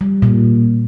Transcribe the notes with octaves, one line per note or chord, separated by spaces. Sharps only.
G3
A#2